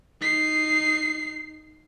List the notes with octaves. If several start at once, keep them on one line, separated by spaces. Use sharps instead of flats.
D#4 C7